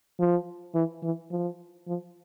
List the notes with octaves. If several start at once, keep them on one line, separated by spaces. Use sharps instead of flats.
F3
E3
E3
F3
F3